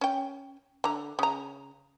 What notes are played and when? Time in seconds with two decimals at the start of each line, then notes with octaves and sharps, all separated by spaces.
0.01 C#4 G5
0.84 D3 A#5
1.19 C#3 A#5